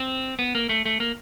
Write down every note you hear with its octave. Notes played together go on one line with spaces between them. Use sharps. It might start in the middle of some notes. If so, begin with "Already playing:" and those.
Already playing: C4
B3
A#3
A3
A3
A#3